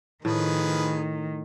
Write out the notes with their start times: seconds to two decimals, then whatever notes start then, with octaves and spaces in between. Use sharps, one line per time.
0.25 A2 D#3 F3 G#4 B4